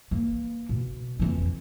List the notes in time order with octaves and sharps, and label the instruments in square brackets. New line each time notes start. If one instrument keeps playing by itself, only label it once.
[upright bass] E3 A#3
B2
F2 E3